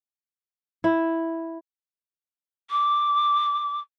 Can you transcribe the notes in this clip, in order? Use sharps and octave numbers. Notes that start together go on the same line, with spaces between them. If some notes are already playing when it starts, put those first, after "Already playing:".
E4
D6